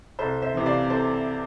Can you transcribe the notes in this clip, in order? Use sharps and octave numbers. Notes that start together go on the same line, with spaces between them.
C2 A4 C5
C5 E5
C3 E3
D5 F5
A4 C5